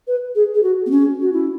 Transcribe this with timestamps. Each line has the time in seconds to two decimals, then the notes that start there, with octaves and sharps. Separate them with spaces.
0.07 B4
0.35 G#4
0.54 G#4
0.63 F#4
0.86 B3
0.91 C#4
1.22 F#4
1.32 E4